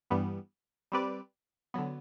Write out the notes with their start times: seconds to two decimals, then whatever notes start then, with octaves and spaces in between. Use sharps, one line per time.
0.11 G2 E3 G3 B3
0.92 G3 C4 G4 B4 D5
1.74 D3 F#3 B3